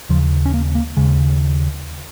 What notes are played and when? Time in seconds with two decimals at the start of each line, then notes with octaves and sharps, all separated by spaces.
0.09 D#2 C#3 F3
0.46 C#4
0.54 A#3
0.75 A#3
0.97 D#2 C#3 G#3